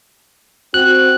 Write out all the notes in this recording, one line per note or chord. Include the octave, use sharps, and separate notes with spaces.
C4 F#4 F#6